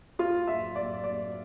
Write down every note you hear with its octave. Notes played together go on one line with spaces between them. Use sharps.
F4 F5
E5
D5
D5